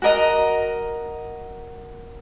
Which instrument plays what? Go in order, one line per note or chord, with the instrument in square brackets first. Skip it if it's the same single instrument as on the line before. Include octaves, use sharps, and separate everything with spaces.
[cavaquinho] F#4 A#4 D#5 A#5